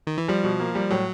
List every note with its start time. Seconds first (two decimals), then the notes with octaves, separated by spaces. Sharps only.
0.07 D#3
0.18 E3
0.28 F3 G3
0.44 B2
0.60 A#3
0.75 G3
0.90 A2 F#3